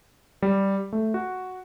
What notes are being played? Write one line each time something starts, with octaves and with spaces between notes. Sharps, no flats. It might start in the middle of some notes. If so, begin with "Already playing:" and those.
G3
A3
F#4